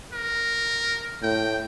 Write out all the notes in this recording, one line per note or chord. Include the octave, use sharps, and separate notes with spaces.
A#4
A2 G5